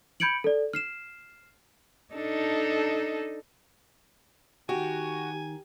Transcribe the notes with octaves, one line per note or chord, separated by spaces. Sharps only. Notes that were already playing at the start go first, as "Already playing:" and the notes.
B5 G6 G#6 C#7 D7 F#7
A4 D5
F6 C7 E7
D4 D#4 A4
D#3 D#4 F#4 G4 G#5